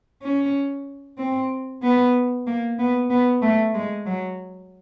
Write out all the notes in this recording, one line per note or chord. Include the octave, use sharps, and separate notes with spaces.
C#4
C4
B3
A#3
B3
B3
A3
G#3
F#3